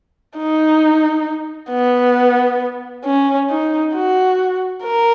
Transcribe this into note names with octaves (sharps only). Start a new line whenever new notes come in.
D#4
B3
C#4
D#4
F#4
A#4